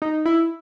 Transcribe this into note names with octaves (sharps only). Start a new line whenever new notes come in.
D#4
E4